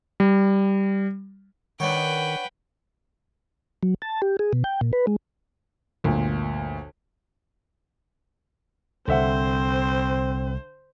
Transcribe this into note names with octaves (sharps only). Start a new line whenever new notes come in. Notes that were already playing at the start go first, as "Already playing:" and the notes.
G3
D#3 D4 B4 C#5 F#5 G5
F#3
A5
G4
G#4
B2
G5
A#2
B4
G#3
G1 D2 A#2
C2 D3 C4 C5 E5 F#5